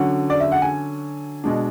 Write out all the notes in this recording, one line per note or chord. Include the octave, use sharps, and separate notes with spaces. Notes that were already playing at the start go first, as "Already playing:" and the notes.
Already playing: D3 F#3 C#4 F#5
D5
E5
F#5
G#5
B2 G#3 D4